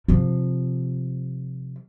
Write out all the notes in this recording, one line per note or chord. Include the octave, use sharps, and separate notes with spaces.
C3 F3